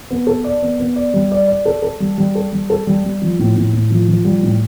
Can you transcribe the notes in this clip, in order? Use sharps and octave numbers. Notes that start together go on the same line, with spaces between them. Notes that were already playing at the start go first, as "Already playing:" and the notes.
B3
A4
D5
B3
B3
D5
G3
D5
D5
A4
A4
G3
G3
A4
G3
A4
G3
G3
F3
A2
A2
A2
F3
F3
G3
A2